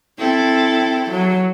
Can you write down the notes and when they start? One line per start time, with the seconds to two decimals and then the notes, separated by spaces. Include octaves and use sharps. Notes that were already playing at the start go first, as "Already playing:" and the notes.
0.18 C4 E4 A4
1.11 F#3